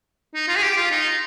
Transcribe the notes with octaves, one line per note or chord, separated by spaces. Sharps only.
D#4
F4
G#4
G4
F4
D#4